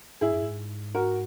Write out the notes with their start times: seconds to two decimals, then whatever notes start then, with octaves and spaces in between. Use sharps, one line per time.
0.21 G#2 E4 G#4
0.31 F#2
0.42 G#2
0.95 F#4 A#4